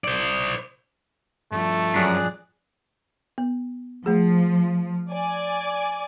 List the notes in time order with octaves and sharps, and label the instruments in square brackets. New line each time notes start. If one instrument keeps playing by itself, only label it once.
[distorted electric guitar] C5 D5
[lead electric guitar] G2 F3 [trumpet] A3
[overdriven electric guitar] F#2 [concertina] G#4 D5 F#6
[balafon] B3
[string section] F3 [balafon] A3 G#4
[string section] D5 G#5